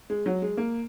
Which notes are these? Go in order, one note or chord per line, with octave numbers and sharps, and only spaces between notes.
G#3
F#3
G#3
A#3